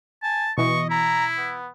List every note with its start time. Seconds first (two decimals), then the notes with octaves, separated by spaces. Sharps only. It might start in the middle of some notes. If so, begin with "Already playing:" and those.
0.23 G#5 A5
0.58 B2 E3 D#5 C#6
0.90 E4 A#5
1.37 B3